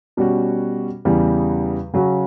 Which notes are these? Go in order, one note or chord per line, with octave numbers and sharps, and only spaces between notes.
B2 G3 C#4 F#4
E2 C#3 E3 G3
C#3 F#3 C#4 F#4